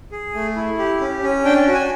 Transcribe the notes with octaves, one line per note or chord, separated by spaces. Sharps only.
G#4
A3
E4
G4
C#4
C#4
D4 G5
F#4
G#5